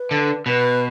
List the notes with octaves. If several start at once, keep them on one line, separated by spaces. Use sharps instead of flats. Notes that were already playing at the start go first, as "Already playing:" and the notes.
Already playing: B4
D3
B2 B4